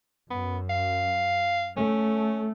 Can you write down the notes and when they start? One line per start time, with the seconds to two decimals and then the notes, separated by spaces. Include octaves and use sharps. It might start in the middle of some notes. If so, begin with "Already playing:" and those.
0.30 F#2 B3
0.70 F5
1.77 A3 C#4